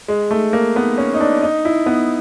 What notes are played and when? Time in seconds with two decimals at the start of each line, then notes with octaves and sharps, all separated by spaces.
0.08 G#3
0.31 A3
0.53 A#3
0.76 B3
0.98 C#4
1.14 D#4
1.21 D4
1.42 D#4
1.65 E4
1.86 B3